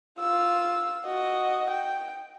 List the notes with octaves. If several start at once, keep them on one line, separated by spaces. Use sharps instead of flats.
F4 E6
F#4 D#5
G5